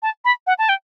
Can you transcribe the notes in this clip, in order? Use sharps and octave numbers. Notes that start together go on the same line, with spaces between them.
A5
B5
F#5
A5
G5